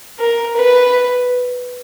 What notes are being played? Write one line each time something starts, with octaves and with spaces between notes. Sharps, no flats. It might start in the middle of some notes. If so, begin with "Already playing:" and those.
A#4
B4